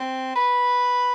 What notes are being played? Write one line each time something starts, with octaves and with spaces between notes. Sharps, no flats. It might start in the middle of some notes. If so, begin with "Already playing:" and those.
Already playing: C4
B4